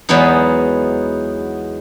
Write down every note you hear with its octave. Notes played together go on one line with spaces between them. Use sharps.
E2 F#3 G#3 B3 D#4